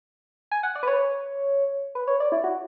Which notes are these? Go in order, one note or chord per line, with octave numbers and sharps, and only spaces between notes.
G#5
F#5
D5
B4
C#5
B4
C#5
D5
E4
F#4